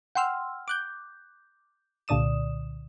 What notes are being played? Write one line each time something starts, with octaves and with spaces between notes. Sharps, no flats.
F#5 G5 C6 E6 F6
D6 F#6 G6
C2 A#2 D3 D5 D#6 E7